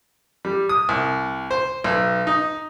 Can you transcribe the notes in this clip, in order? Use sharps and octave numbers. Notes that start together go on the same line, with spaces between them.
G3
D#6
C2
C5
B1
D#4